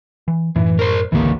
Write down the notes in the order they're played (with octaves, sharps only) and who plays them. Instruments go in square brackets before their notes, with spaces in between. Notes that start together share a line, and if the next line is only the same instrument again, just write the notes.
[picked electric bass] E3
[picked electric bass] F#2 A2 [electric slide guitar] E3
[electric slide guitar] A#4 C5
[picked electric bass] G#1 C#2 D3 [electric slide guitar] E3 A#3